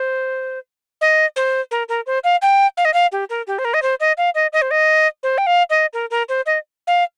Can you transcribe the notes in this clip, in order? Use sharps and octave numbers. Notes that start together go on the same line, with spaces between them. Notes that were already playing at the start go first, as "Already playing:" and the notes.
Already playing: C5
D#5
C5
A#4
A#4
C5
F5
G5
F5
D#5
F5
G4
A#4
G4
C5
A#4
D#5
C5
D#5
F5
D#5
D#5
C5
D#5
C5
G5
F5
D#5
A#4
A#4
C5
D#5
F5